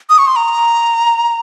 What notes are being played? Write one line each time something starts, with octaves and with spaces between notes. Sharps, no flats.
D#6
C#6
C6
A#5